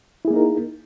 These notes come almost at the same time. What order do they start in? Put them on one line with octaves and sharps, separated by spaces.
E4 G#4 A#3 D#4 A#4